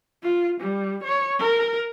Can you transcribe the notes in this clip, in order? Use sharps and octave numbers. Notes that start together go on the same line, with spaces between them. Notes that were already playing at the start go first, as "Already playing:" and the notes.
F4
G3
C#5
A#4